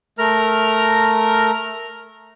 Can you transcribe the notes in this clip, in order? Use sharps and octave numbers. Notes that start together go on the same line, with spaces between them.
A3 A#4 A#5 F6